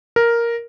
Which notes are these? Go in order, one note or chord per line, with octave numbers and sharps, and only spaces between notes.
A#4